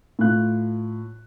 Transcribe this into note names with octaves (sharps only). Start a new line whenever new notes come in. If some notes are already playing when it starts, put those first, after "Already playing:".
A2 F4 F#6